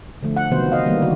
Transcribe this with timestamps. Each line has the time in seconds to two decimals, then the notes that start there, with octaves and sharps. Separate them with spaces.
0.23 D3 F3 A3
0.36 F#5
0.51 C3 D#3 F3 F#3 B3 C5
0.72 D#5 F5
0.85 D#3 E3 G3 A#3 B3
1.02 D3 D#3 F3 F#4